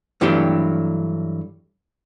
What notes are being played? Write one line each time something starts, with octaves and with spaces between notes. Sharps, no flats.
G2 E3 F#3 A3 D4 G4